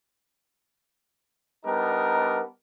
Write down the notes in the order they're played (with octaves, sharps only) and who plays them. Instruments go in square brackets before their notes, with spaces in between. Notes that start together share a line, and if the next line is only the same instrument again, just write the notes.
[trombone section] G3 B3 D4 D#4 A#4